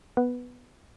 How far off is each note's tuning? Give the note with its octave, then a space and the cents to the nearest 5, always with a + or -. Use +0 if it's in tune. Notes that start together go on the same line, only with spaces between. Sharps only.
B3 +0 B4 +0